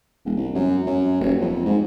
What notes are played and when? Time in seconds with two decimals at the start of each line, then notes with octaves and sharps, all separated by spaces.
0.25 E1
0.37 C2
0.54 F#2
0.87 F#2
1.21 D#1
1.41 F2
1.65 G#2